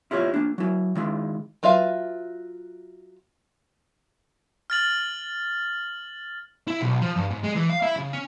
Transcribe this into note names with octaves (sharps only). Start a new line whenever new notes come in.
E4 F4 G4 C#5
A#3 D4
F#3 E4
D#3 G#3 E4
F#3 F4 B4 E5 F5
F6 A6 F#7
E4
B1
F3
G2
G#2
G#3
E3
F5
E4
C#3
C#4